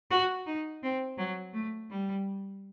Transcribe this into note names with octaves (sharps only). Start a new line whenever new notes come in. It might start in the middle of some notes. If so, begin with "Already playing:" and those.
F#4
D#4
C4
F#3
A3
G3